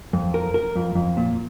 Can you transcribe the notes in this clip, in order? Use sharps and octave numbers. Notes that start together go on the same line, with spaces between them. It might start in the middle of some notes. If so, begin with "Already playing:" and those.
F2
A#4
A#4
F2
F2
A#2